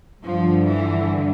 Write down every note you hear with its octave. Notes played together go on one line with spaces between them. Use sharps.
G2 D3 F3
E3